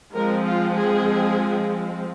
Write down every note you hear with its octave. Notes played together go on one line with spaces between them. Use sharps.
F3 G#3 C4 A#4
F4
G#4